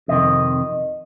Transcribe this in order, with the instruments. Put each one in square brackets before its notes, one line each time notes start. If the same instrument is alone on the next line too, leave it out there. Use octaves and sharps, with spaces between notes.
[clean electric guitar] F2 C3 D#3 D#5